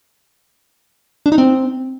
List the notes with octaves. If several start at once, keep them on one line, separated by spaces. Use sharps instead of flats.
D4
D#4
C4